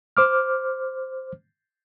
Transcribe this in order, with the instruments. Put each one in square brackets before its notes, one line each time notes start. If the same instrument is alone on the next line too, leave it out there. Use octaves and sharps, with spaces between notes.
[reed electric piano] C5 D6 F6